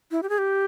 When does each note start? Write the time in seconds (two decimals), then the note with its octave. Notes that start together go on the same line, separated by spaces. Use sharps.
0.11 E4
0.23 G4
0.29 G#4
0.38 G4